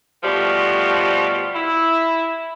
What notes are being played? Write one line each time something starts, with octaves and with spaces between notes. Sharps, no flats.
B2 F3 G3 A3
E4